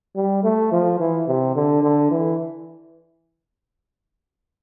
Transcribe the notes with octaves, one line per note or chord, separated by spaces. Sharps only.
G3
A3
F3
E3
C3
D3
D3
E3